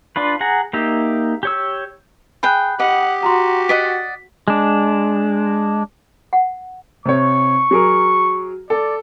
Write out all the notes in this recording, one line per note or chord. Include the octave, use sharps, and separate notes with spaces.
D4 F4 B4
G#4 F#5 A#5
A#3 D#4 G4 E5
G4 C#5 E6
G#4 G5 B5 F#6
G4 D#5 F#5
F#4 A#5 C6
D5 D#5 F#5 B6
G#3 D4
F#5
C3 C4 C#5 C#6
F#3 G#4 A#4
A4 D5